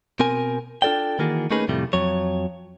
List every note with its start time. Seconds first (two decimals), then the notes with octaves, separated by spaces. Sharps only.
0.19 B2 C4 A#4 G#5
0.82 D4 F4 A4 D5 G5
1.19 D#3 E3 A#3 F#4 G#4
1.51 A3 A#3 C#4 D#4 G#4 B4
1.68 F2 A2 C3 G3 A3
1.93 F2 F#3 C#5